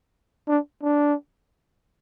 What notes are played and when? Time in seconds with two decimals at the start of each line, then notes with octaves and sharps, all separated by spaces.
0.48 D4
0.83 D4